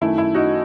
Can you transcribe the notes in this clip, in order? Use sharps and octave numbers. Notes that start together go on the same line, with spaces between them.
F#2 D#3 A3 E4
E4
D#4 F#4